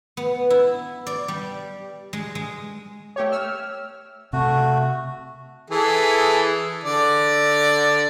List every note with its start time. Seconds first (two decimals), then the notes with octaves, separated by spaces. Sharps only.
0.17 B3
0.50 E4
1.07 D5
1.28 G3
2.13 G#3
2.35 G#3
3.16 A3 G4 C#5
3.32 E6 F6
4.33 C3 A3 F#4
5.70 E3 G#4 A4
6.84 D3 D5